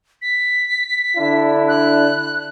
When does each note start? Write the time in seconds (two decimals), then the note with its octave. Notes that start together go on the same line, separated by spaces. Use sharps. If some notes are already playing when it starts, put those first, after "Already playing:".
0.22 B6
1.17 D3 D4 E4
1.68 F#6